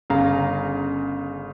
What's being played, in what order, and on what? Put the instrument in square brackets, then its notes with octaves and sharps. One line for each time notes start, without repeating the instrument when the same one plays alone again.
[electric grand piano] G1 C#3 F5 A#5